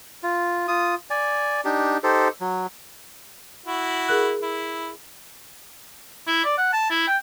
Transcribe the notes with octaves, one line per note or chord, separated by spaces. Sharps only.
F4
F4 D#6
D5 G#5
D4 D#4 G4
D#4 G4 A4 C5
F#3
E4 F#4
G#4 A#4 F#6
E4
E4
D5
F#5
A5
E4
G5